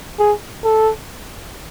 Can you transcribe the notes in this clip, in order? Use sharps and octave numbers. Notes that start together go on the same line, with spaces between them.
G#4
A4